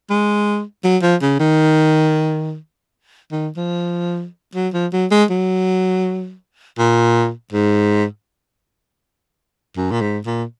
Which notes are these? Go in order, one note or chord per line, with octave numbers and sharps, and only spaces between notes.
G#3
F#3
F3
C#3
D#3
D#3
F3
F#3
F3
F#3
G#3
F#3
A#2
G#2
F#2
A#2
G#2
A#2